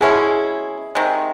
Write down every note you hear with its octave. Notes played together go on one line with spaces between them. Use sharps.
B2 G#3 C#4 E4 G#4
C3 D#3 G#3